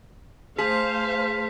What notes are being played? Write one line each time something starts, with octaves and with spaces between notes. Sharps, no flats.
A3 G#4 C5 F5 A5 C6 B6